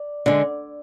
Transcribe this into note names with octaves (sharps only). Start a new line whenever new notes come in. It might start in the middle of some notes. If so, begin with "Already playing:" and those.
Already playing: D5
D3 G#3